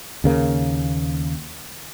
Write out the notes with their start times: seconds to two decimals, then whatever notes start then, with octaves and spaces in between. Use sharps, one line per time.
0.24 D#2 C#3 A#3